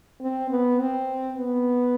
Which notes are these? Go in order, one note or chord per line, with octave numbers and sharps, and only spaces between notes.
C4
B3
C4
B3